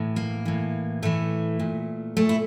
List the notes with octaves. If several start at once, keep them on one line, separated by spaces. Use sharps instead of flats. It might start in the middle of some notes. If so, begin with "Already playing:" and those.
Already playing: A2 E3
A#3
A2 E3
A2 E3 A3
A#2
A#2 A3
E4